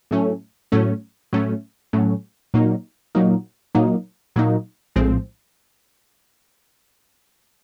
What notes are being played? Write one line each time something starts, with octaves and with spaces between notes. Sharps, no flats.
A2 F#3 A3 C#4
A2 F#3 A3 C#4
A2 F#3 A3 C#4
A2 F#3 A3 C#4
A#2 F#3 A#3 D#4
A#2 F#3 A#3 D#4
A#2 F#3 A#3 D#4
A#2 F#3 A#3 D#4
A#1 A2 F3 G#3 C4